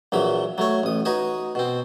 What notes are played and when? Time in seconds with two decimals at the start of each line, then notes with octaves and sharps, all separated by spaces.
0.12 A#1 E3 F#3 B5
0.58 F#3 A3 C#5
0.83 A1 D#6
1.05 D#4 F#4 B4 G#5 D#6
1.55 B2 C4